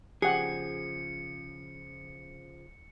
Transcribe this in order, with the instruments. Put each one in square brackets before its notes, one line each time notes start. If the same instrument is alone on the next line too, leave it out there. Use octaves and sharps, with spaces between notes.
[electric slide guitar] C#3 F3 [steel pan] G4 F#5 [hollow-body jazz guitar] G#4 [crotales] C#7